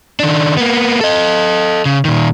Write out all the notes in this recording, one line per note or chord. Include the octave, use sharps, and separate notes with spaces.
D#3 D4
A#3 B3
A4 D#5
C#3
A#2 D#3